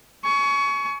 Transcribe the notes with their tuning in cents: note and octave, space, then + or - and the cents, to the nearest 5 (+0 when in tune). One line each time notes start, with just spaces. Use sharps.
G#5 +35 C#6 +20